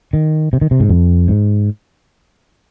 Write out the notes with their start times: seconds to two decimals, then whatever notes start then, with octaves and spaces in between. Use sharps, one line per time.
0.13 D#3
0.53 C3
0.61 D#3
0.71 C3
0.80 G#2
0.89 F2
1.28 G#2